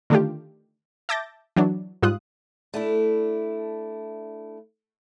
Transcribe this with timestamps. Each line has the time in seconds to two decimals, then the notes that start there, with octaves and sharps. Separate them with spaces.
0.10 D3 D#3 A3 D4 F4 G4
1.09 E5 A5 D6 G6 A6 A#6
1.56 E3 F#3 D4
2.02 G#2 G3 F4 D#6 F#6
2.74 A3 D4 E4